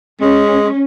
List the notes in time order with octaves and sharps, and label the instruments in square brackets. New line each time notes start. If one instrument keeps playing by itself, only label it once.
[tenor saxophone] G#3 [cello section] C#4